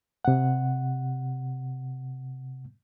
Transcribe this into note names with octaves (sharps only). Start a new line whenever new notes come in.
C3 F#5